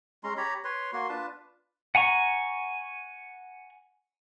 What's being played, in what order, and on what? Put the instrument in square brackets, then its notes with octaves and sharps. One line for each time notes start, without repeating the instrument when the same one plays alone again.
[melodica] G#3 C#4 A#5 C6
G4 C#5 A#5 B5
B4 C#5 C6
A#3 F#4 C6
D4 F4 B4 A5
[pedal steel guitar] F#5 G#5 A#5 C#6